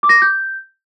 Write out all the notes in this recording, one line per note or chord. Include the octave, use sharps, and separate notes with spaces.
D6
A#6
D6
G6